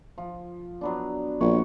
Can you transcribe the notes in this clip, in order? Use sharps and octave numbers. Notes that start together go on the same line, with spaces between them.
F3
F#3 B3 D4
A#1 C#5 F#5